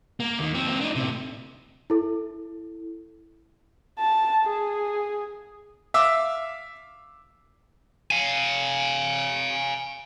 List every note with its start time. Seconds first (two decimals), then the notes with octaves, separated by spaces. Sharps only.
0.20 A#3
0.39 D#2 D#3
0.54 F3 C4
0.67 A#3 C4
0.81 D4 D#4
0.96 A2 C3
1.90 E4 A4
3.99 A5
4.46 G#4
5.94 E5 F5 D6 E6
8.11 F5 G#5